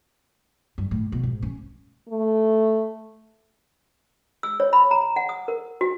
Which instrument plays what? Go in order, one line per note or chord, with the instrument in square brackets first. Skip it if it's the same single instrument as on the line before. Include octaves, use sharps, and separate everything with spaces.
[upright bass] G2
A2
B2
G#2
C#4
[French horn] A3
[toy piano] E6
C#5
B5
A#5
F#5
D#6
A#4
F#4